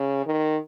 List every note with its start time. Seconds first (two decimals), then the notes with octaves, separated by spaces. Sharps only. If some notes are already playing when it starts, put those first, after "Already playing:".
Already playing: C#3
0.26 D#3